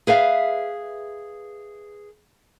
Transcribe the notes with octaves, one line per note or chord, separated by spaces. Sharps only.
G#4 B4 E5 F5